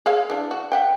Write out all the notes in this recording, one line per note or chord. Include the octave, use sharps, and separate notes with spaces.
G#4 C#5 F5
E3 D4
F#4
E5 F#5 G5